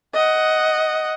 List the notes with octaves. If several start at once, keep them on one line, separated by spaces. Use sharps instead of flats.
D#5 F#5